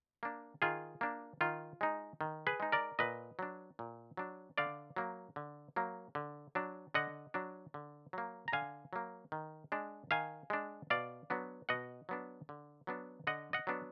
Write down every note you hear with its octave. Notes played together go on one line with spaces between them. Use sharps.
A#3 D4
D#3 F4 G#4
A#3 D4
D#3 F4
G#3 D#4
D#3
G#4 B4
G#3 D#4
A#4 D5
A#2 B4 D#5
F#3 D4
A#2
F#3 D4
D3 D5 F5
F#3 A#3
D3
F#3 A#3
D3
F#3 D4
D3 D#5 F#5
F#3 D4
D3
F#3 A#3
A#5
D3 F5 G#5
F#3 A#3
D#3
G#3 D4
D#3 F5 G#5
G#3 D4
B2 D5 F5
F#3 B3 D4
B2 D#5 F#5
F#3 B3 D4
D3
F#3 B3 D4
D3 D#5 F#5
D#5 F#5
F#3 B3 D4